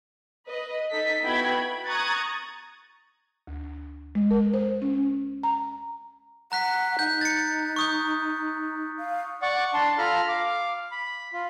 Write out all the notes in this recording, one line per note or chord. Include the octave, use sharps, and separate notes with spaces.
B4 D#5
D#4 A4 B6
B3 E4 F#4 G5 B5 G#6
B5
A#5 C#6 D#6 F#6 G#6 A6
D2
G#3
A#4
C5
C#4
A#5
F#5 A#5 F#6 B6
D#4 G6
A6 C#7
C#6 D#6 G6
F5
D5 F#5 C#6 D6
D4 A5 C6
F4 A4 A#5 B5 F6
F5 D6
B5
F4